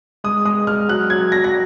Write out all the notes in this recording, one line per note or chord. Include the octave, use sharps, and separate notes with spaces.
G#3 D#6
G#3 D#6
G#3 F6
F#3 F#6
F#3 G#6
F#3 A#6
A#6